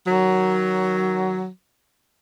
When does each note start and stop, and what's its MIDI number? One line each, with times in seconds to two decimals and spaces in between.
0.06 1.47 51
0.06 1.47 54